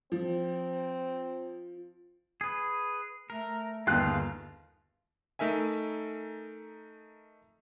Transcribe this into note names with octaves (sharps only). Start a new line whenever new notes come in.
F3 C4
G#4 B4
A3 A#4
G1 D#2 D#3 F4 G#4 F5 G5 F#6
A3 D#4 A#4 E5 G#5